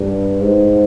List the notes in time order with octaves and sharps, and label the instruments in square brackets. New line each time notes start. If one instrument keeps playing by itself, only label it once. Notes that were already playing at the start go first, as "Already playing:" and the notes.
Already playing: [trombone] G2
G#2